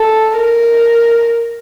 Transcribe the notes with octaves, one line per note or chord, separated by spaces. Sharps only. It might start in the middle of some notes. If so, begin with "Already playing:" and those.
Already playing: A4
A#4